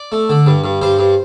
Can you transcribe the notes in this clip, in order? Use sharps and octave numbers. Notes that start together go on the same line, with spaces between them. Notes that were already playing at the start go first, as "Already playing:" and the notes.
Already playing: D5
A3
D3
G2
G2
G2 C5
G2